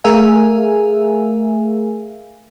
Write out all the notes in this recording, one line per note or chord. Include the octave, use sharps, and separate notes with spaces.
A3 G#4 A#4 E5 F5 G#5